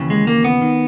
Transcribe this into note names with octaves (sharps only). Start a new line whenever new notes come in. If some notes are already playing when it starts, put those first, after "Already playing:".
Already playing: D#2 C#3 E3
G#3
A#3
B3
D#3